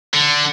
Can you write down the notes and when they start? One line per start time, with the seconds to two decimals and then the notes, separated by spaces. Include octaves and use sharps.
0.14 D3